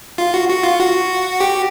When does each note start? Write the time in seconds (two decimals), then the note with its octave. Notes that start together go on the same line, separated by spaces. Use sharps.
0.18 F4
0.34 F#4
0.49 F#4
0.63 F4
0.80 F#4
1.41 G4